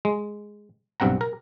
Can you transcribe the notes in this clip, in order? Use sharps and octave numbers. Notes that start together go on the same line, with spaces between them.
G#3
B1 G2 C4 F#5 A#5
A#4